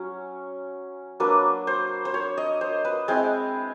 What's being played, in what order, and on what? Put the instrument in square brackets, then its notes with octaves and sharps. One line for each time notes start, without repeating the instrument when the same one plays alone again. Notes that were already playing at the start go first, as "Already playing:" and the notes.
Already playing: [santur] F#3 C#4
F#3 A#3 D4 B4
C5
C5
C#5
D#5
C5
B4
G#3 C4 E4